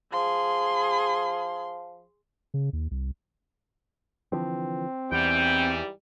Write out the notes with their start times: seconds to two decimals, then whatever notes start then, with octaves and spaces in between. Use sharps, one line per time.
0.13 F3 G#4 C6
2.54 C#3
2.73 D#2
2.91 C2
4.32 D3 E3 F3 C4
5.12 E2 G#2 E3 G3 G5